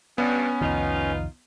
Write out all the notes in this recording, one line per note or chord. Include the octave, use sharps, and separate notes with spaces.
G2 B3 C#4
C2 F2 D#3 D#4 F4